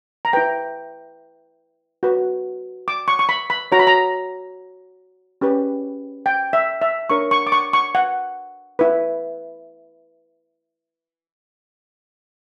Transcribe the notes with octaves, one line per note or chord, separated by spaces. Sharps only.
A#5
E4 B4 G5
F#4 B4
D6
C#6
C#6
B5
B5
F#4 C#5 A#5
B5
A#5
C#4 G4 B4
G5
E5
E5
D4 A#4 C#5 C#6
C#6
D6
C#6
C#6
F#5
E4 B4